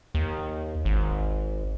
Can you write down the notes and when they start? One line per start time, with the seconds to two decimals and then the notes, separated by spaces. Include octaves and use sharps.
0.15 D#2
0.85 G#1